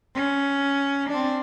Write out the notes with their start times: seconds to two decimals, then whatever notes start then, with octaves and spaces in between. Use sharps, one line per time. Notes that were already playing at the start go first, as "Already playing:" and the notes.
0.15 C#4
1.09 C4 D4